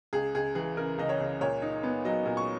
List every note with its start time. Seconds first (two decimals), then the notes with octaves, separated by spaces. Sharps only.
0.13 C#2 G#4
0.35 C#2 G#4
0.55 E3 G#4
0.77 C#3 A#4
0.98 C#2 D#5
1.09 C#5
1.20 C#2
1.41 A#2 C#5
1.62 D#4
1.83 B3
2.05 F#3 D#5
2.26 A#2
2.37 C#6